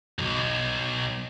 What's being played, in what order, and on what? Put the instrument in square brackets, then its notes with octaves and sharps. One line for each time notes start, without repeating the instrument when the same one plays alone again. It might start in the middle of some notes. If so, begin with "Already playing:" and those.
[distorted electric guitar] B1 F2